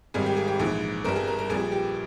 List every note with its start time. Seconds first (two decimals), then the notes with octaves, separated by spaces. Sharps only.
0.14 G#1 G#2 D#3 G3 G#4
0.26 G4
0.37 G#4
0.48 G4
0.59 A#1 G#2 E3 G#4
1.04 G1 G2 G3 A#4
1.16 G#4
1.27 A#4
1.39 A#4
1.49 A#1 A#2 G3 G#4
1.72 G4